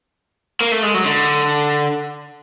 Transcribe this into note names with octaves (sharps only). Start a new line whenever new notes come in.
A#3
A3
G#3
F#3
D3